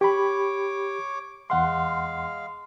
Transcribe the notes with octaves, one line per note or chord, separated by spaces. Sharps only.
G4 C#5 B5 D6
E2 G#3 F5 F#5 C6